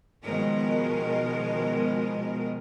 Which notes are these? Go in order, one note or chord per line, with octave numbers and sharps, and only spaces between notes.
B2 D#3 F3 G#3 A#4